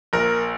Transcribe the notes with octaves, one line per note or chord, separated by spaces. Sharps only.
A#1 A#4